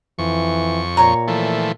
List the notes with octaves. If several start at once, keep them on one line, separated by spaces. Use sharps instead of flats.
F2 E3 C#6
A#2 C#5 A#5
E3 F3 A3